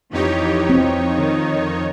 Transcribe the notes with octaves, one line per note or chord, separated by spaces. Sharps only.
F2 E3 D#4 G4 C#5
C4
D#3